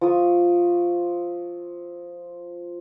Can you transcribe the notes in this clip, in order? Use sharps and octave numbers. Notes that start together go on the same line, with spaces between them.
F3 E5 C#6 D#6